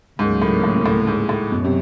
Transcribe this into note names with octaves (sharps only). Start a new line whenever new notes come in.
D2 G#2 C#3 F#3 A#3
A2
A2
A2
G#2
A2
F#2 B2
C3